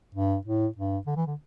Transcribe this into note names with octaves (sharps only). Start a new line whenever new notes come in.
G2
A2
G2
D3
E3
D3